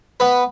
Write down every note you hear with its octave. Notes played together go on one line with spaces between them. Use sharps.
B3 B4